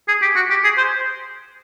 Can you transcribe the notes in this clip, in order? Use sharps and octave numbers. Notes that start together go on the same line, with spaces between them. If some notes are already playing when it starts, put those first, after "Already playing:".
G#4
G4
F#4
G4
G#4
C5